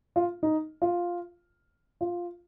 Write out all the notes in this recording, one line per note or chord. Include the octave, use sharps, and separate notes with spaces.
F4
D#4
F4
F4